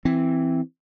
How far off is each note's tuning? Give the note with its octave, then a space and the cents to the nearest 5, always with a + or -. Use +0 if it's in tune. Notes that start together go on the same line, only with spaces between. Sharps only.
E3 +5 C4 +0